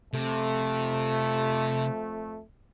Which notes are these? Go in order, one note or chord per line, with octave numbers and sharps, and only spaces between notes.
F2 C3 A3